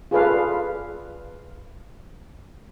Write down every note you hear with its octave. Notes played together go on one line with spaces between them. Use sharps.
F4 G#4 A4 B4 D5 F5